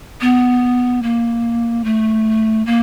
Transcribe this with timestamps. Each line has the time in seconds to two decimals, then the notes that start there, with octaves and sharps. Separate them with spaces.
0.21 B3
1.03 A#3
1.84 A3
2.66 A#3